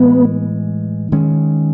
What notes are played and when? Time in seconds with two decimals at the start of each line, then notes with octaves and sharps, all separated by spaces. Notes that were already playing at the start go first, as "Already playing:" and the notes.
Already playing: A2 E3 G#3 B3
1.12 D#3 G#3 C#4